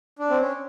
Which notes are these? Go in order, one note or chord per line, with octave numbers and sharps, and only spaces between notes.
D4
C4
C#4